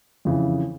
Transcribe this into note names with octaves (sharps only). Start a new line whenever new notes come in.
F2 C#3 E3